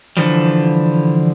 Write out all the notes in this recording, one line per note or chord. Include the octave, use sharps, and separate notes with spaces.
D3 E3 F3 G3